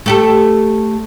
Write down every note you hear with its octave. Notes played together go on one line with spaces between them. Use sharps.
A3 G4 A4